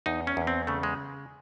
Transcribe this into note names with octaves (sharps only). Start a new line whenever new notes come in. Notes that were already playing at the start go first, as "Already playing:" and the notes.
E2 D#4
C#4
E2
C4
C#3 A3
G#3